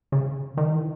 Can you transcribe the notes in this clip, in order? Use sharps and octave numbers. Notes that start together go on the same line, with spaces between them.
C#3
D#3
E3